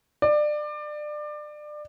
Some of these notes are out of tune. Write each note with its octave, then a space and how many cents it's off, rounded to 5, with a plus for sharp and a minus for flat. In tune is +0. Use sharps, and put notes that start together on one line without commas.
D5 +25